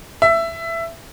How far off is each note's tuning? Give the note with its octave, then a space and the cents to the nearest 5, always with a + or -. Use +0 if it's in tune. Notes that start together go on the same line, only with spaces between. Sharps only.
E5 +15